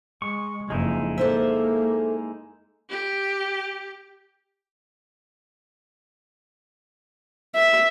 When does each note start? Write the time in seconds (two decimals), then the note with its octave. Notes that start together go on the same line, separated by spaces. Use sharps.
0.22 G#3 C#6
0.70 F#1 F2 G#3 D#4 E4
1.18 A#3 A4 C5 E5
2.90 G4
7.55 E5